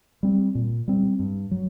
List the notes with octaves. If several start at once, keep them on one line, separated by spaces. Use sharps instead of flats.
G3 C4
A#2
G3 C4
G2
F#3